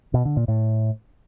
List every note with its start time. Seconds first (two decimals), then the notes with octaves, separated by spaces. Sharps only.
0.14 B2
0.25 D3
0.37 A#2
0.48 A2